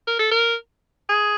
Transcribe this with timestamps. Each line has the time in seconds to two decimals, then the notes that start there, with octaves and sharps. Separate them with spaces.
0.07 A#4
0.19 A4
0.32 A#4
1.09 G#4